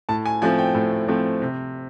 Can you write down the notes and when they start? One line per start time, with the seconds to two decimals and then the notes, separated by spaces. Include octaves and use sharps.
0.09 A2 A5
0.26 G#5
0.42 F3 A3 C4 G#5
0.58 G5
0.75 A2
1.08 F3 A3 C4
1.42 C3